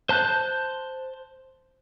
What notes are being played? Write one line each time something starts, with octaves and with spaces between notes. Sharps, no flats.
C5 A5 F#6 G6